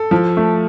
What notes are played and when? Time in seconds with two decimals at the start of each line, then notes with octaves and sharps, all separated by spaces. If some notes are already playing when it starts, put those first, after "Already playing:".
Already playing: A4
0.11 F3
0.37 A3